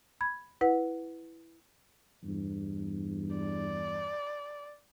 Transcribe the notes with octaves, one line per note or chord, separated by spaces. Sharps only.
B5 G#6
E4 B4 F#5
E2 G2
D5